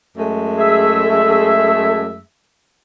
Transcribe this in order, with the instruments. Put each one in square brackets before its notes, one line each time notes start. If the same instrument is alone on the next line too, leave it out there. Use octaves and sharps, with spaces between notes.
[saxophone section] F#2 G#3 A3
[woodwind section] G#4 E5